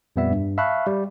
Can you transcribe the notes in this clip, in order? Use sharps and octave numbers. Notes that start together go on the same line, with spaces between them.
F2 A#2 G3 B3 D5 E5
G2
E5 F5 A5 B5 C#6 F#6
G3